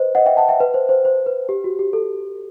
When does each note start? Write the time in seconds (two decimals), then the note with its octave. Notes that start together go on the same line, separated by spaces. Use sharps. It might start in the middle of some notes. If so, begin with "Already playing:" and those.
Already playing: B4 C5 D#5
0.15 D#5 F#5
0.26 E5 G5
0.37 F#5 A5
0.48 E5 G5
0.60 B4
0.74 C5
0.89 C5
1.05 C5
1.26 B4
1.49 G4
1.64 F#4
1.79 G4
1.93 A4